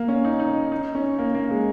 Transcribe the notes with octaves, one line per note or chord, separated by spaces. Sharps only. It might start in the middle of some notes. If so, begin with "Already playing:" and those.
Already playing: A#3
C#4
D#4
D#4
D#4
C#4
A#3
A#3
G#3